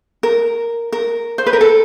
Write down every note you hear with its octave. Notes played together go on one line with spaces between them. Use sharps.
A#4
A#4
C5
B4
A#4
A4